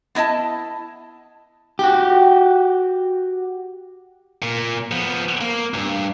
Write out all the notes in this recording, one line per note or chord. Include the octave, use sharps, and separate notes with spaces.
B3 E4 D#5 A5
F#4 G4
A#2
F3 B3
A#3
C2 G2